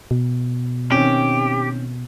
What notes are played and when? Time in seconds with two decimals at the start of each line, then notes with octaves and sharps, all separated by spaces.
0.11 B2
0.92 D#3 C4 C#4 G4